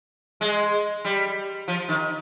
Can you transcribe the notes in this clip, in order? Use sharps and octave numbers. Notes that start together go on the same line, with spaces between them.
G#3
G3
F3
D#3